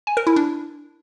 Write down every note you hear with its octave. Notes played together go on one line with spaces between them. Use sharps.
G#5
A#4
E4
D4